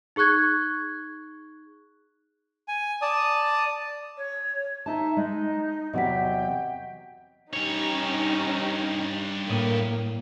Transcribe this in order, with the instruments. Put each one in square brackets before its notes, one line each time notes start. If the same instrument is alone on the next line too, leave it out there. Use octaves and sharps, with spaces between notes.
[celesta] D#4 G#4 C#6 F#6 G#6
[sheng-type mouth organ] G#5
D5 A5 D#6
[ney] C#5
[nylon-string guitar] D#4 A5 [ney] E5
[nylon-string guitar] G#3 [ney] D#4
[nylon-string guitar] E2 C3 F#3 [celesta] D#5 F#5 B6 [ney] G5
[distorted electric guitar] G2 C#5 [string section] C#4 D#4 G4
[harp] A2 D#6 [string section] A#3